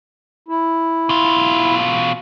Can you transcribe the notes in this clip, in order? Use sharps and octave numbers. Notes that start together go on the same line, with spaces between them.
E4
B2 F4